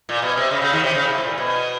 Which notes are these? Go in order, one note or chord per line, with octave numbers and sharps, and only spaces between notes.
A#2
B2
C3
C#3
C#3
D#2 D#3
C3
C#3
C3
A2
A#2
B2